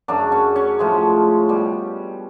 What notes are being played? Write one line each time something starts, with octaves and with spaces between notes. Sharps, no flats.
F#2 C#3 F#3 D4
C#4
C#4
A2 F3 G#3
B2 G3